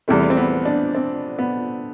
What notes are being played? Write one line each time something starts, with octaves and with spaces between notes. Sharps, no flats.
E2 C3 G3 A3
C4
B3
D4
C4
B3